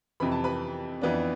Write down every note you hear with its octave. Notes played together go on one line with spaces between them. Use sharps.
F2 C3 E3 B5
A5
B4 B5
F2 E3 B3 D4